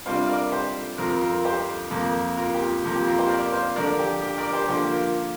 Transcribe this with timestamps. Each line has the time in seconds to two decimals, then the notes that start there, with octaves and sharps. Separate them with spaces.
0.05 C3 G3 D4 F4 C5 F5
0.22 F5
0.28 A#4 D5
0.52 G4 C5
0.98 F2 F3 C4 F4 A#4
1.21 F4 A#4
1.45 G4 C5
1.91 F2 F3 A#3
2.37 F4 A#4
2.54 G4
2.60 F4
2.84 F2 F3 A#3 F4
2.95 G4
3.06 F4 A#4
3.19 G4 C5
3.29 A#4 D5
3.52 C5 F5
3.76 D3 F3 D4 F4 A#4 D5
3.99 G4
4.22 G4
4.38 A#4 D5
4.53 G4 C5
4.68 D3 F3 A#3 G4 C5
4.91 F4 A#4